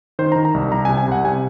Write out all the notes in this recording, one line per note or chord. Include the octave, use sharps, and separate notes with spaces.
D#3 C5
D#3 A#5
A#5
C2
C2 A#5
G#5
C3
G#5
C2 F#5
C3 G#5